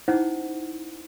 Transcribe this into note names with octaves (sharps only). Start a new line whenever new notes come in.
C#4 D#4 E4 C5 F#5